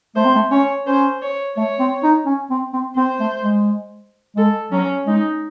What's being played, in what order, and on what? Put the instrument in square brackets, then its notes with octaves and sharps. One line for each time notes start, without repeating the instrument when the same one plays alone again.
[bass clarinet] A3 [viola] C5
[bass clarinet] C4
A3
[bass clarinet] C#4 [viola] C#5
[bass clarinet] C#4 [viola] C5
[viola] C#5
[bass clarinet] A3 [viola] C#5
[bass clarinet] C4
D#4
C#4
C4
C4
[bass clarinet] C4 [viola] C5
[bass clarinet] A3
G#3
[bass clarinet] G#3 [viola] A4
[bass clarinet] F#3 [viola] C#4
[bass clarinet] G#3 [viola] D#4